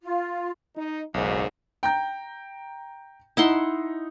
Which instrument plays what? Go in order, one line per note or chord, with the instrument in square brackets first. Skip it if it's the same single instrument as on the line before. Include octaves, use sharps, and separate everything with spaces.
[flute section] F4
[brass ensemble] D#4
[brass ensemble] F#1 G#2 [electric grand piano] B1
[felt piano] G5 A#5 G6
[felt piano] D#4 [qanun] E4 F#5 C6